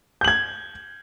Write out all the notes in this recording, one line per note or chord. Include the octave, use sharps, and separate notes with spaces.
G6 G#6 F#7